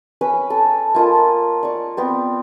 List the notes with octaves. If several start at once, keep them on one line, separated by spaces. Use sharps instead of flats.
C#4 B4 B5
A4
A#3 F4 D#5 A5
D5 C#6
B3 C4 C5